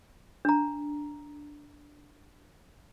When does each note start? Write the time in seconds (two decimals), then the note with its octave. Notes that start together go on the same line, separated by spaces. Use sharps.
0.45 D4 A#5